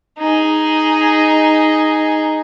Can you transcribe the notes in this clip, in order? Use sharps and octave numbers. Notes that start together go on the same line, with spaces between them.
D#4 G#4